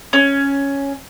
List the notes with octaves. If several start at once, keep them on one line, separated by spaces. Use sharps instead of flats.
C#4